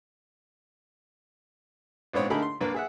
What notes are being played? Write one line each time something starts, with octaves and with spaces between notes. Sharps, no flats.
A#1 G#2 B3 C4 C#5
D3 A3 D#4 G#4 A#4 B5
C6
C2 A#3 D4 A#4 B4
G#4 E5 F#5